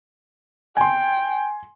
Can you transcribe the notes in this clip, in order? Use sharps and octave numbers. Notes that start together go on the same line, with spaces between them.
G5 G#5 C6